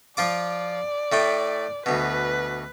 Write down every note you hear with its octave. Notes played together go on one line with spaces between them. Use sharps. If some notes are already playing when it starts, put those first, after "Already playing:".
F3 F4 D5 D6
A2 A3 G5
D2 B2 B4